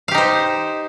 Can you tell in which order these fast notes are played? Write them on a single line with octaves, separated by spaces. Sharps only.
F5 G4 D#4 C5